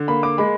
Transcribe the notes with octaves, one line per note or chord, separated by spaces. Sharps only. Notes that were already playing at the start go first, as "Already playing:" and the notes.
Already playing: D3
A#3 B5
D6
G#3 B5